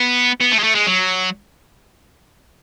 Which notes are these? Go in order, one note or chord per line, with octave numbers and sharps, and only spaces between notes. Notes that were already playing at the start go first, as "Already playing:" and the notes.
Already playing: B3
B3
A3
G#3
A3
G#3
F#3